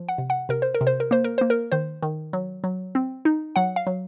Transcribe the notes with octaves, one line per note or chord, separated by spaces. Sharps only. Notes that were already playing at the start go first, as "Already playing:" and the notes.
Already playing: F3
F#5
C3
F#5
C3 A#4
C5
A#4
C3
C5
A#4
A#3 C5
A#4
A#3 C5
A#4
D#3 C5
D#3
F#3
F#3
C4
D#4
F#3 F#5
F5
F#3